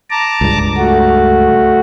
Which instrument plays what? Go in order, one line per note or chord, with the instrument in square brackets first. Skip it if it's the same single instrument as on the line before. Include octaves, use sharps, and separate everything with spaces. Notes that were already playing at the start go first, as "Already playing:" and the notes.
[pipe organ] A5 A#5 D6
[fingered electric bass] C#2 G2
[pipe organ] A3 F#4